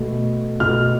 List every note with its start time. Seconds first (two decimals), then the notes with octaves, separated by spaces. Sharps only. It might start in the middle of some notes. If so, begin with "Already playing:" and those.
Already playing: B2 A3
0.60 B2 A3 F6